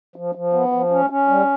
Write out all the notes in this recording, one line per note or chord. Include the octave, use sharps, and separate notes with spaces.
F3
F3
B3
F3
C#4
C#4
G3